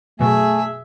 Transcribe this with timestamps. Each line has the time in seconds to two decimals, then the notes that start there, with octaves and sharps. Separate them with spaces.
0.20 F#2 B2 A3 G#4 E5 G#5